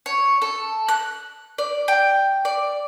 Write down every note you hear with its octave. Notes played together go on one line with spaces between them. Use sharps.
C#5
A4
F#6
D5
G5
D5